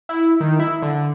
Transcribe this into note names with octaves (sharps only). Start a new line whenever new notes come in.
E4
D#3
E4
D3